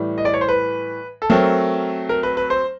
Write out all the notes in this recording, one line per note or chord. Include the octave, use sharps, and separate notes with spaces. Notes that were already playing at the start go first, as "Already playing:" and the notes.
Already playing: A2 E3 G3
D#5
D5
C#5
C5
B4
A4
F#3 A3 C4 A#4
A#4
B4
B4
C5